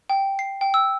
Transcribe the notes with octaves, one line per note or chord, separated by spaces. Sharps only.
G5
C7
G5
E6